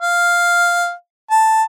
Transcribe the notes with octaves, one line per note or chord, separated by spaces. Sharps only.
F5
A5